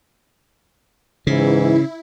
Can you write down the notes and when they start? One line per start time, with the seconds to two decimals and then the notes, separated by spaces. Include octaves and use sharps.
1.27 G#2 C#3 E3 E4